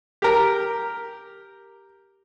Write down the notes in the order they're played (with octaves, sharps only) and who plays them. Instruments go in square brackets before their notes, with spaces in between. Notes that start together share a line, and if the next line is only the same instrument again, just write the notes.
[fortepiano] G4 A#4